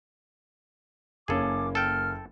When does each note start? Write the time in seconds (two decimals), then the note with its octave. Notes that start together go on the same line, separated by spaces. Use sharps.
1.28 F#1 A#3 C#4 G#4 A4 D6
1.75 A4 G5 F6